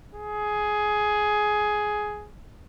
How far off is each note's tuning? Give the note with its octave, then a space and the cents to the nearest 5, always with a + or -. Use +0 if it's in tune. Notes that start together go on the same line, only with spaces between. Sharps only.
G#4 +10